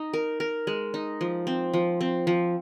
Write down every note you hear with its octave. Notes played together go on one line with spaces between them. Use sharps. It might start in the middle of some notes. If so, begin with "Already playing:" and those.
Already playing: D#4
A#4
A#4
G#3
D#4
F3
C4
F3
C4
F3